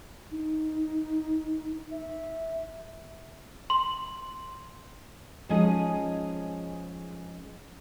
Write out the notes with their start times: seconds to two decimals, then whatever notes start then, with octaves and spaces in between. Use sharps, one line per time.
0.31 D#4
1.91 E5
3.70 C6
5.49 F3 G#3 C#4 D#4 G#4 D#5